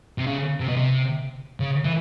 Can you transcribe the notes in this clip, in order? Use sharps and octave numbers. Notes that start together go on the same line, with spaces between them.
C3
C#3
C3
B2
C3
C#3
E3